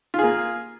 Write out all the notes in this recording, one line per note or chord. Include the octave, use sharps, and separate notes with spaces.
A#3 F4 G#4